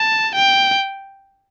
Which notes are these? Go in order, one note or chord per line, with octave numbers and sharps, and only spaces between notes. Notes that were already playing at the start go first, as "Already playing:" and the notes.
Already playing: A5
G5